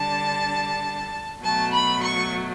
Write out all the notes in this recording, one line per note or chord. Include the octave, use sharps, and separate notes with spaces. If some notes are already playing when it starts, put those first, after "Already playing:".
Already playing: D3 G3 D4 A5
B2 F#3 A3 A5
B5
C#6